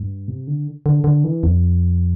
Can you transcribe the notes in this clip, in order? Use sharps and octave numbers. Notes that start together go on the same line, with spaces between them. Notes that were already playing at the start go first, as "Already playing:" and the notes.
Already playing: G2
C3
D3
D3
D3
E3
F2